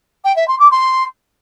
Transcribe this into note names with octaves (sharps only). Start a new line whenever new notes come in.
G5
E5
C6
D6
C6